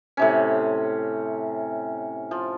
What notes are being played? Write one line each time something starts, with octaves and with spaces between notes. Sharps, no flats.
A2 C3 C#4
F3